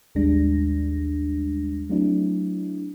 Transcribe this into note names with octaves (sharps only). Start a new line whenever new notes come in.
A1 D#2 G3 G#3 D4 A#6
F#3 A3 C4 D4 E4